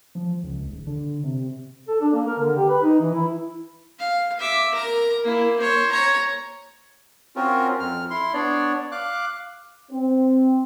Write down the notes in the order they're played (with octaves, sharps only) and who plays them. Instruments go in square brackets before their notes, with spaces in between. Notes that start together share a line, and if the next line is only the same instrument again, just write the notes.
[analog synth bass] F3
C#2
D#1
D3
C3
[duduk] A4
D4
A#3
A#4
D3
G4
B4
D#4
E3
E4
[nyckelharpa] F5
E5 D6
A#4 A#5
A#3 E4
C5 C#5
C#5 A#5
[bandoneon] C4 C#4 F4 F#4 A#4
F2 F6
E4 C6
B3 D4 C#5 D5
F5 D6 F#6
[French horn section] C4